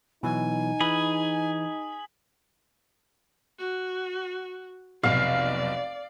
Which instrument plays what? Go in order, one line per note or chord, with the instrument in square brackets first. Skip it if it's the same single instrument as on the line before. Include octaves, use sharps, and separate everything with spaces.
[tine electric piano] B2 E3 F#3 [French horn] D#4 [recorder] G#5
[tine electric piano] E3 [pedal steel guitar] G#4 B5
[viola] F#4
[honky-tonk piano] F1 B1 [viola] D5 [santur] F5